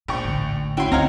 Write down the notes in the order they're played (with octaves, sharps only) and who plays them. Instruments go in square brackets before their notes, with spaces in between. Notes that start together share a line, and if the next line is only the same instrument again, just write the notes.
[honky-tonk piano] A#1 G5 C#6 [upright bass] B3
[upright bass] A1 D2
[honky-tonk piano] C#4 E4 F#4 [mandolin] G5 C6
[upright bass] D2 [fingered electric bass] C4 [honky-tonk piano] D#4 F#5 [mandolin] C#5 F5 A#5